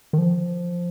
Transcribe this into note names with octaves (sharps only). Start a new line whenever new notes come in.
D#3
F3